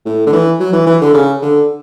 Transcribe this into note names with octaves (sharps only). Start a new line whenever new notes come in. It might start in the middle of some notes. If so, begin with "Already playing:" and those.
A2
D3
E3
F#3
E3
E3
D3
C#3
D3